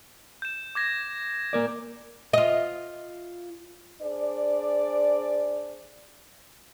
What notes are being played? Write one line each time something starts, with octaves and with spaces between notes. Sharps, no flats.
G6 E7
D6 G#6 A#6
A#3 A#4 D5
F4 D#5
D4 G#4 C5 D5